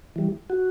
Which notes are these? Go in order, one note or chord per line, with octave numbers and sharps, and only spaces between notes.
E3 G3
F#4